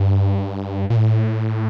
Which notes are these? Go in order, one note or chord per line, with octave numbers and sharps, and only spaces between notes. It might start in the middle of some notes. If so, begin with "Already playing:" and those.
Already playing: G2
A#2
A2